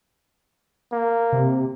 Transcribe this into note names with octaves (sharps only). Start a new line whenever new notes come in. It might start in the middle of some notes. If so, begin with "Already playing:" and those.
A#3
C3